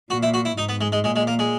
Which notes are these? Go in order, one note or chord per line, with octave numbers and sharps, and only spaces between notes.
A#2 F#4
E4
F#4
E4
G#2 D#4
B3
G#3
G#3
A#2 G#3
G#3
A#3
G#3